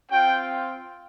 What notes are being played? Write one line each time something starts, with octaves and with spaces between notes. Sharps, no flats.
C4 F4 G5